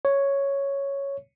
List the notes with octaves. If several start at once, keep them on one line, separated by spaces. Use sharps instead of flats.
C#5